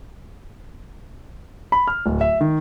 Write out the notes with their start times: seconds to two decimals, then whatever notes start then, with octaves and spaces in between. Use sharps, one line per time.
1.72 B5
1.88 F6
2.06 D1
2.21 E5
2.41 D#3